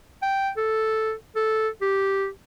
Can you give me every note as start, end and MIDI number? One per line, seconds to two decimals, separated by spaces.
0.22 0.50 79
0.57 1.13 69
1.36 1.69 69
1.81 2.28 67